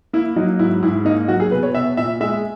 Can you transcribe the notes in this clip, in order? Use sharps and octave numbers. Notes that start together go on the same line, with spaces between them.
A#3 E4
F#3 D#4
G#2 E4
G#2 E4
A#3 D#4
F#3 F#4
G#4
B2 B4
C#5
B2 E5
A#2 E5
G#3 E5